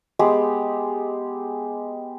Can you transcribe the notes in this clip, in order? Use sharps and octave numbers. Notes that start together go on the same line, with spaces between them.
G#3 B3 G4